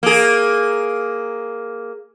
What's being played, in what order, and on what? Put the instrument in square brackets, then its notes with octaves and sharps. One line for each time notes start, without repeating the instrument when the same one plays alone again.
[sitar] A#3 G#4